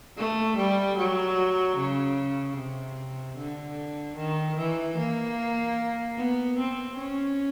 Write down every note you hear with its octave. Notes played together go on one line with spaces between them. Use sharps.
A3
G3
F#3
C#3
C3
D3
D#3
E3
A#3
B3
C4
C#4